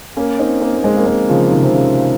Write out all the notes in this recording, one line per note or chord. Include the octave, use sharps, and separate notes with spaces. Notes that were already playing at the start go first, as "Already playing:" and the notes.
A#3 C#4
C4 D#4
A#3 C#4
A#3
G#3 C4
A#3
G#3 C4
C#3 F3
C3 D#3
C3
C#3